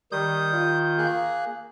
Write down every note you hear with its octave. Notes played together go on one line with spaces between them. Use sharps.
D#3 G3 D#6 G6
F4
A#3 G#4 F#6